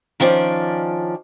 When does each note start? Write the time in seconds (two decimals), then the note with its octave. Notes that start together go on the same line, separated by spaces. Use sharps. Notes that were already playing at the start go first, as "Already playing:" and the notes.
0.20 D#3 F3 C#4 D4 D5